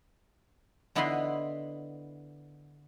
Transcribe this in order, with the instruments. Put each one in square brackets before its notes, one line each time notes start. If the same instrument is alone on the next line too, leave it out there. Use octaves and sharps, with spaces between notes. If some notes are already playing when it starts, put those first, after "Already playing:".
[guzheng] D3 B3 E4 D#5 B5 C6